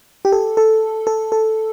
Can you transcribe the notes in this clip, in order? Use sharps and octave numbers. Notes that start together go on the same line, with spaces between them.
G4
A4
A4
A4
A4